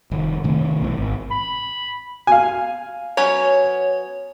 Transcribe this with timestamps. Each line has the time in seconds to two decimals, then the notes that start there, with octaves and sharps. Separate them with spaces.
0.11 F1 D#3
0.44 C3 D#3 A3 C4
0.81 B1 B2 D#3 E3
0.97 G#1
1.31 B5
2.27 F5 G#5
3.17 F#3 B3 C#4 C#5